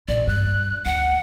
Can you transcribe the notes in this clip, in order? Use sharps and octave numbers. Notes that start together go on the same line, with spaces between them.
A#1 D5
G2 F#6
D2 F#5